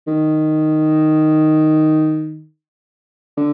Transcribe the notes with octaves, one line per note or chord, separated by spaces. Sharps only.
D#3
D3